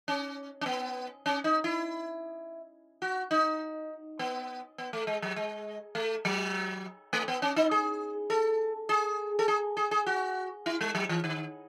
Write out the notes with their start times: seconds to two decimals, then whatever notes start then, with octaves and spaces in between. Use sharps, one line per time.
0.08 C#4
0.61 C#4
0.66 B3
1.26 C#4
1.44 D#4
1.64 E4
3.02 F#4
3.31 D#4
4.19 B3
4.78 B3
4.93 A3
5.07 G#3
5.22 F#3
5.36 G#3
5.95 A3
6.25 F#3
7.13 A3
7.28 B3
7.42 C#4
7.56 D#4
7.71 G#4
8.30 A4
8.89 G#4
9.39 A4
9.48 G#4
9.77 G#4
9.91 G#4
10.06 F#4
10.66 E4
10.81 G#3
10.95 F#3
11.09 E3
11.24 D#3